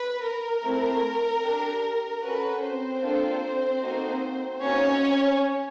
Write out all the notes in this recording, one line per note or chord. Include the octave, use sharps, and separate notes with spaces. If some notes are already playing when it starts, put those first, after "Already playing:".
Already playing: B4
A#4
A3 C4 E4
D4 G4
C#4 F#4 A4 B4
C4 C5
A#3 D4 F4 A4
A#3 D#4 F#4 A4
A#3 C#4 D#4 F#4 A4 C#5